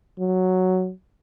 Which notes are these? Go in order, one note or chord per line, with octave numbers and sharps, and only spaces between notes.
F#3